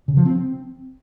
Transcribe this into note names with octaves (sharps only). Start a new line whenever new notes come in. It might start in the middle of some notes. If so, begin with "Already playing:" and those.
C#3
F3
C4